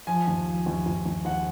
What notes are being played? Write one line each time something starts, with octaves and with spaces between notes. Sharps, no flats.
F3 G#5
D#2
F3
D#2
D#2
D#2
D#2 F#5